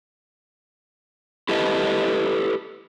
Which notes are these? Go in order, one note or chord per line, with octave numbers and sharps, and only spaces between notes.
E4 G4 A4 B4 D#5